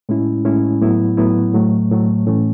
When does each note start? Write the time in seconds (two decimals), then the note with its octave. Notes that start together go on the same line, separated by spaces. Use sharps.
0.09 A2 G#3 C#4 E4
0.45 A2 G#3 C#4 E4
0.81 A2 F#3 B3 E4
1.17 A2 F#3 B3 E4
1.54 A2 F#3 A3
1.91 A2 F#3 A3
2.27 A2 E3 A3 C#4